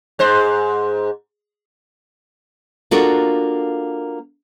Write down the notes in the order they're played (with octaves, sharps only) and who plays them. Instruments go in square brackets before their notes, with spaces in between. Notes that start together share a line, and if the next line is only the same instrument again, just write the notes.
[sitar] G#2 C5
[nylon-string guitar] A#3 D4 F4 F#4 A4 A#4